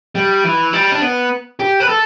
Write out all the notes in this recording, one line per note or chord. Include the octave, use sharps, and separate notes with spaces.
G3
E3
G3
D4
B3
G4
B4
A4